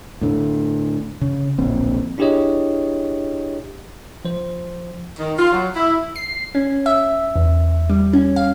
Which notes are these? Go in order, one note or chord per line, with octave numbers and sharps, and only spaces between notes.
A2 D3
C#3
D1 A#1 C4
D4 E4 G4 G#4 C#5 D#5
F3 C5
D#3
F4
F#3
E4
C7
C#4
E5
E2
G3
C#4
F5